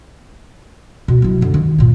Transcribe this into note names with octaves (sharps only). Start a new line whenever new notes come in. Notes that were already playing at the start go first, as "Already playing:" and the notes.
B2
F#3 E4
F#2 D3
D#3
G2 A#2